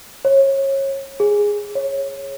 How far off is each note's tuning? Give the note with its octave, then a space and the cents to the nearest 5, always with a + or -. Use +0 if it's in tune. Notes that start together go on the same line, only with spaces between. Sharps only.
C#5 -30
G#4 -5
C#5 -15